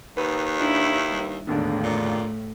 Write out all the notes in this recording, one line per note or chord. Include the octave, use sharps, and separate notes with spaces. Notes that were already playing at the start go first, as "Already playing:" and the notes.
D#2 B4
D4 E4
G2
E1 D#2 A2 D3 B3 D4
A#2